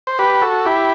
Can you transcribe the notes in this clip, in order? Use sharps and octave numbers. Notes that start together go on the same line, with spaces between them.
C5
G4 B4
F#4 A4
E4 G4